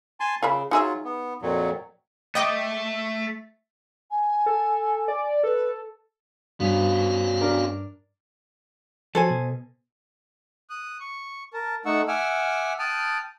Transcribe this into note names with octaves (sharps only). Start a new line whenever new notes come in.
G#5 A5 C6
C#3 F4 E5 B5
F#3 D#4 F4 G#4 E5
B3
F2 A#2 F#3
A3 D#5 G5 D6
G#5
A4
D5
A4 B4
G2 B3 C#4 F#4 F5
D4 A#4
F3 F#3 A4 C5 G#5
B2
D#6 F#6
C#6
A#4 A5
A3 D#4 F#5 C#6 E6
E5 F#5 G#5 D6 E6 F6
G5 A5 D#6 F6 F#6